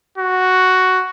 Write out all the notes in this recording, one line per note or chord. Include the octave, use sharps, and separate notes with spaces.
F#4